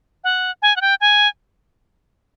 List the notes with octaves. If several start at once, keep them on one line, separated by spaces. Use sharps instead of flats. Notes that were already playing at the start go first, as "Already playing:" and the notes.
F#5
G#5
F#5
G5
G#5